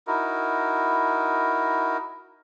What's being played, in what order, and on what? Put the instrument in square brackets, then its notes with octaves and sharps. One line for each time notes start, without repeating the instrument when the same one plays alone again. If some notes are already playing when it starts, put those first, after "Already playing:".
[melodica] D#4 E4 F#4 A#4